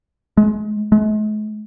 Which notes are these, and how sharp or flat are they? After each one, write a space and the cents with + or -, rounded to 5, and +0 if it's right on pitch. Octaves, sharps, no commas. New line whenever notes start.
G#3 +30
G#3 +45